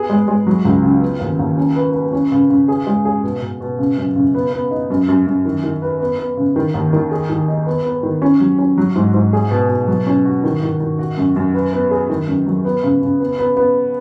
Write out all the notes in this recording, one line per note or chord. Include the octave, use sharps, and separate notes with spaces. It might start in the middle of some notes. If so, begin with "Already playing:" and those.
Already playing: B3 G#4
G#3
G#3
F#3
C#2
C#3
B3
D#2
D#2
C#4
B4
B4
C#4
C#3
C#3
G#4
G#3
G#4
B2
B2
B2
C#3
F#2
C#3
B3
B3
D#4
F#2
F#2
F#2
D#3
D#3
B4
B3
B3
C#3
D#3
D#2
D#3
G#4
D#3
D#4
B3
B3
D#3
C#4
F#3
C#4
F#3
G#2
G#2
G#4
B2
B2
F#3
C#4
F#4
D#3
D#3
D#3
F#4
F#2
F#2
B4
B3
G#4
D#3
F#2
F#3
B3
C#3
C#3
B3
B3
B3